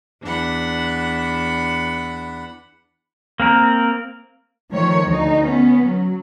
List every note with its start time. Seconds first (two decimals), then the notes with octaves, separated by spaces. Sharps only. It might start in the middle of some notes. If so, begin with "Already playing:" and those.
0.21 E2 D4 F#5 B5
3.40 A#3 C4 A#4
4.70 D#3 F3 A3 C#5
5.05 D2 D#4
5.45 B3 C#4
5.86 F#3